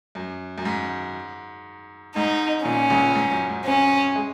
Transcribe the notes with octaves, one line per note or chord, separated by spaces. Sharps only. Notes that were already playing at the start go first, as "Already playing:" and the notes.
F#2
F#2
G#2
G#2 D#4
A#1 A#2 C#4
C#2 C#3
G#2
F#2
G#2
C#4
G#3